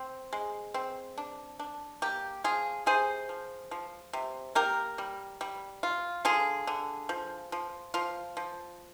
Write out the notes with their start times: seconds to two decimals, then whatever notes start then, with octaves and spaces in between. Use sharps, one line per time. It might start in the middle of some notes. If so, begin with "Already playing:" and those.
Already playing: C4
0.33 G#3
0.74 C4
1.18 D4
1.60 D4
2.02 A#3 G4
2.44 F3 F4 G#4
2.86 C3 G#4 C5
3.29 F3
3.71 F3
4.13 C3
4.55 A#3 G4 A#4
4.98 G3
5.41 G3
5.83 F4
6.25 D3 F4 G#4
6.67 D3
7.09 F3
7.52 F3
7.94 F3 F4
8.37 F3